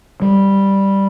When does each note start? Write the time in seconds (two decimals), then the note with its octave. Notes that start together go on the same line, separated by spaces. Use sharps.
0.22 G3